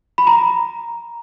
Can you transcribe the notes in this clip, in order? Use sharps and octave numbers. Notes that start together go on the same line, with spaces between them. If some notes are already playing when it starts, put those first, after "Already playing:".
B5
A#5